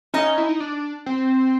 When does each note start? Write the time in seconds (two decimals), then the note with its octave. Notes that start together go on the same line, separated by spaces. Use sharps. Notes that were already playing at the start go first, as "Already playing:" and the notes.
0.14 C#4 D#4 D#5
0.38 E4
0.49 D#4
0.60 D4
1.06 C4